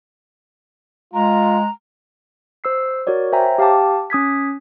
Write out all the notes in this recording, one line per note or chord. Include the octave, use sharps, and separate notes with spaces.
G#3 F4 A#5
C5 E6 C7
F#4 A#4 C#5 D5
C5 C#5 E5 G5 G#5 A#5
G4 F5 G5 A5 D6
C#4 D#6 G#6 B6